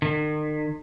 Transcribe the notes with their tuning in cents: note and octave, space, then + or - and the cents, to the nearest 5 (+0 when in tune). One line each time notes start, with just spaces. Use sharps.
D#3 -40